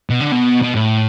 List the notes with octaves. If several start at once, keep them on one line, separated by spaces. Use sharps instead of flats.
B2
D3
B2
B2
A2